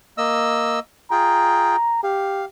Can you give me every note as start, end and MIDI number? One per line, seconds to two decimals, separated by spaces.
0.18 0.80 58
0.18 0.80 75
0.18 0.80 88
1.11 1.76 65
1.11 1.76 68
1.11 1.76 79
1.11 2.03 82
2.04 2.45 67
2.04 2.45 77